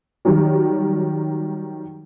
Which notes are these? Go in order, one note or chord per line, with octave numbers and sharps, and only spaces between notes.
D#3 F#3 G3